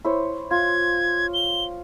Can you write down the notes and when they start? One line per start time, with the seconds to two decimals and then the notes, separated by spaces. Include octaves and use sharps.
0.05 E4 C5 C#5
0.51 F4 G#6
1.34 G7